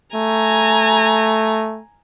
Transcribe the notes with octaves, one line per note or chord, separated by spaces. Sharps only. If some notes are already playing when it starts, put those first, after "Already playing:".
A3 G#5 A#5